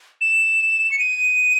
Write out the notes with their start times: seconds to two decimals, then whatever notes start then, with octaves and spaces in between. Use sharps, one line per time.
0.21 E7
0.91 C#7
0.99 D#7